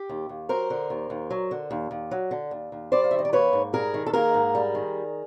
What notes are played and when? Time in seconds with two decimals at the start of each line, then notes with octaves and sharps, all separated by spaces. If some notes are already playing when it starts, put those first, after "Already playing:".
Already playing: G4
0.09 D#2
0.29 D#2
0.49 F#3 A#4 C5
0.70 D3
0.90 D#2
1.10 D#2
1.31 F#3
1.51 D3
1.71 D#2
1.91 D#2
2.11 F#3
2.31 D3
2.51 D#2
2.72 D#2
2.92 G3 C5 D5
3.04 F5
3.11 D#3 E5
3.19 D#5
3.25 D5
3.33 A#3 B4 C#5
3.53 G#2
3.73 G3 G#4 A#4
3.94 D#3
4.06 A4
4.13 A#3 G#4 A#4
4.34 G#2
4.55 G3
4.75 D#3